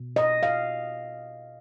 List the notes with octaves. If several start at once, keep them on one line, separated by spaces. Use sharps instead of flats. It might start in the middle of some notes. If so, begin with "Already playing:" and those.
Already playing: B2
D#5
F5